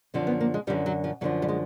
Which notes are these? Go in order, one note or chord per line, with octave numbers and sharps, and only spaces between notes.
F#2 D3 F3 C4
B3
A#3
G#3
F#2 D3 F3 G3
F#3
F3
F#2 D3 F3 F#3
G3
G#3